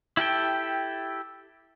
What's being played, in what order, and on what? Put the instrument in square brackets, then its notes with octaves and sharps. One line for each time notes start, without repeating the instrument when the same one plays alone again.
[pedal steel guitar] E4 G4 A4 G5